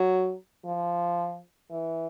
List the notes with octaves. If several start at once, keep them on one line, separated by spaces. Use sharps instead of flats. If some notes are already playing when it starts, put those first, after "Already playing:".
Already playing: F#3
F3
E3